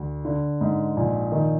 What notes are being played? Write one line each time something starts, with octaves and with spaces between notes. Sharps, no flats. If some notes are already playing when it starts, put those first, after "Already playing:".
Already playing: D2
D3
G#2
A#1
D#3